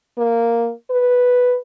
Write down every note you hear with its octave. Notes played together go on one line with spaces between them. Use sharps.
A#3
B4